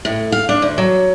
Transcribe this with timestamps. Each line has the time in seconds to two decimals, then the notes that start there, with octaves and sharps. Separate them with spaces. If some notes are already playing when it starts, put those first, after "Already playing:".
0.05 A2
0.32 F5
0.49 D4
0.62 D2
0.78 F#3